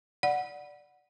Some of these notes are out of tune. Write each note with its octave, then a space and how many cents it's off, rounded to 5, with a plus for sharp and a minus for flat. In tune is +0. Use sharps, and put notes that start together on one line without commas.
D5 +0 F#5 -5 B5 +0